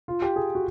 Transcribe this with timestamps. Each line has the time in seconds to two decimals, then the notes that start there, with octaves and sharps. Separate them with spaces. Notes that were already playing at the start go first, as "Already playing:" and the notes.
0.08 F4
0.22 G4
0.36 G#4
0.55 F#4